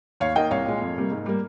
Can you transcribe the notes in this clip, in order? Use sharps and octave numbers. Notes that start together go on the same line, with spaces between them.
D#2 C#5 F5
D#3 A#3 D#5 G5
C2 C#5 F5
A#2 G#3
F2
C3 G3 A#3
G#2
G3 A#3